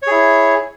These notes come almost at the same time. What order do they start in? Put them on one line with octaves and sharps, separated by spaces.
C#5 G#4 E4